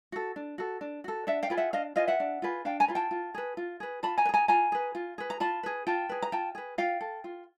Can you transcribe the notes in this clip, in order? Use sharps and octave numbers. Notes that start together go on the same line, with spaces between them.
F#4 A4
D4
F#4 A4
D4
F#4 A4
D4 E5 F#5
F5 G5
F4 G#4 B4
E5 F#5
D4 D#5 F5
F4 G#4 B4 D#5 F5
E5 F#5
D4
F4 G#4 B4
D4 F5 G5
G#5 A#5
F4 G#4 B4
G5 A5
F4
G#4 B4
F4
G#4 B4
F4 A5 B5
G#5 A#5
B4
G#4 G#5 A#5
F4 G#5 A#5
G#4 B4
F4
G#4 B4
A#5
F4 A5 B5
G#4 B4
F4 G5 A5
G#4 B4
A#5
F4 G5 A5
G#4 B4
F4 F5 G5
A4
F4